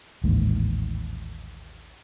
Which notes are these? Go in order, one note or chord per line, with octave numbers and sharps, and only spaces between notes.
A1 D#2 G#2